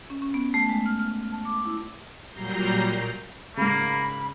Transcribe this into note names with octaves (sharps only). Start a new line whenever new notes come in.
C#4
C#4
B3
A3
G#3
F6
F6
A5
D6
E4
A#2 F#3 G3 A#5 G6 C7
G#2 C#3 A#3 B5